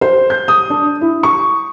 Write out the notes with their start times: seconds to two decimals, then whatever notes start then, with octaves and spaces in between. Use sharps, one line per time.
0.01 C5
0.30 G6
0.48 D#6
0.70 D4
1.01 E4
1.23 C#6